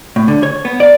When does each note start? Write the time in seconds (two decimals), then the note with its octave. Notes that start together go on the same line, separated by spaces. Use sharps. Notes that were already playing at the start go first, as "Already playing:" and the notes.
0.16 A2
0.28 D3
0.43 C#5
0.65 B3
0.80 D5